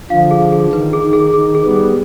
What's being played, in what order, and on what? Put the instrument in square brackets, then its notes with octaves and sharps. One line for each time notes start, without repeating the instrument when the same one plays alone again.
[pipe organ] D3 F3 [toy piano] F5
[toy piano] G#4
G#4
[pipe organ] D#3 [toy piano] B4
[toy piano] G#4
[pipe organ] D#3
[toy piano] G#4
[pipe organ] D#3 [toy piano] G#4
[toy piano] G#4
[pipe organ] G3 B3
[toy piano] G#4